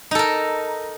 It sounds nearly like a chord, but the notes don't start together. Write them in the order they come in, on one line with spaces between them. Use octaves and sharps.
D#4 A4 A#4